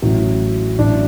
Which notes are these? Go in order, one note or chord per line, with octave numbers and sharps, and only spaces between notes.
A1 A2 F#3
A1 A2 F#3 D4